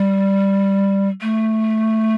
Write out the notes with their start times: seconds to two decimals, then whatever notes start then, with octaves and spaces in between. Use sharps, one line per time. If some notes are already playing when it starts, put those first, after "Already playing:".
Already playing: G3
1.22 A3